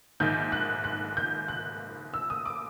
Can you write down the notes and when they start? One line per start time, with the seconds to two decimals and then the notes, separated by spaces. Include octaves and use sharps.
0.20 A#1 G#2 D#3 G6
0.52 F#6
0.84 F#6
1.17 G6
1.48 F#6
2.14 E6
2.30 D#6
2.45 D6